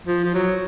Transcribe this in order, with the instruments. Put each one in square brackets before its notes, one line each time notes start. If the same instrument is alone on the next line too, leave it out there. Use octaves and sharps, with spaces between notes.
[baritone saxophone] F3
F3
F#3